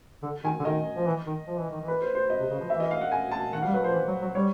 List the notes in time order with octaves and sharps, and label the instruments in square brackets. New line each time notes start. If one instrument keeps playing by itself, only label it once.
[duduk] D3
[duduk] D#3 [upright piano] G#5
[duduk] D3
[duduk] D#3 [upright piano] D#5
[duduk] F3
E3
D#3
F3
E3
D#3
E3
[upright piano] B4
C5
C5
D#5
[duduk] C3
C#3
F3
[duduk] E3 [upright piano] E5
[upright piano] D#5
F5
F#5
G#5
A5
[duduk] D#3 [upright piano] F#5
[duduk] G3 [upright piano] F5
[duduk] F#3 [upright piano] B4
[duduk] F3 [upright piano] C5
[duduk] E3
F#3
F#3
[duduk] G3 [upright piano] C#5